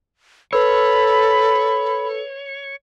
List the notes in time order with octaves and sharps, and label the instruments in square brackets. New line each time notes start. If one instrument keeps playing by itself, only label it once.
[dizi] A4 [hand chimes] B4 E6 [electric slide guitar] C#5 [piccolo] B5